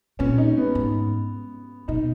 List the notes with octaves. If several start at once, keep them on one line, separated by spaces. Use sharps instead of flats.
A#2 C#4
D#4
B3
G#2
B2 D#4